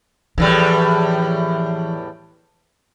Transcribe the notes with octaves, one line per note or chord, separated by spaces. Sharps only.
E2 A2 E3 F3 G3